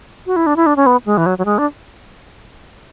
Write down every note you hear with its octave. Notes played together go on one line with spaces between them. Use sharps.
F#4
E4
D4
E4
D4
C#4
B3
G#3
E3
F#3
F#3
G#3
D4